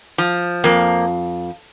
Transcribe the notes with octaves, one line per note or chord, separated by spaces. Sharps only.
F3
F2 A#3